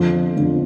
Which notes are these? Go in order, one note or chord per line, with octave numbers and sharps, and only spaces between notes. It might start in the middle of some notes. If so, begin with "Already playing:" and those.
Already playing: F2 D3 F3
F2 D3 F3